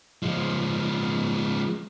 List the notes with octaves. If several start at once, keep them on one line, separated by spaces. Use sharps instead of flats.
F3 G#3